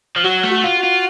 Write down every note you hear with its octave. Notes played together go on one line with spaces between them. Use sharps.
F3
F#3 F#4
A3
F#4
F4
F#4
F4